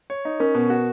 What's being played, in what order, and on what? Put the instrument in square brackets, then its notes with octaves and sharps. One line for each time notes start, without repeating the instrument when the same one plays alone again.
[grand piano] C#5
D#4
[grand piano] C#4 [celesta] A#4
[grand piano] B2
F#4